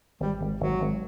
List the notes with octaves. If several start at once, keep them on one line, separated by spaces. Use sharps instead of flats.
G#1 G3
G#1
G#1 F#3
G#1